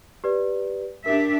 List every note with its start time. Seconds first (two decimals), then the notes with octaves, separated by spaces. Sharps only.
0.24 G4 B4 D5
1.06 D4 G4 A#4 E5